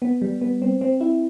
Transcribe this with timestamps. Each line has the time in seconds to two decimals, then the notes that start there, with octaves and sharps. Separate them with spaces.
0.02 B3
0.22 G3
0.41 B3
0.62 C4
0.81 C4
1.01 E4